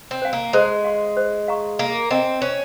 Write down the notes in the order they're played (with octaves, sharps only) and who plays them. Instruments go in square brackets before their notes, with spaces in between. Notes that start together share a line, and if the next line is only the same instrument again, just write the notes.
[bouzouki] C4
[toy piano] C5 F5 G#5
[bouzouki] A#3
[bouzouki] G#3 [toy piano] C5
[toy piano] F5 C6
C5
F5 A#5 C#6
[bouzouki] A#3 [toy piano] A#4
[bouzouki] C4 [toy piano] D#5 G#5 C6
[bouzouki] C#4 [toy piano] C5